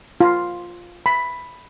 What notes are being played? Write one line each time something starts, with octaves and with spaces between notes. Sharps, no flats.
F4
B5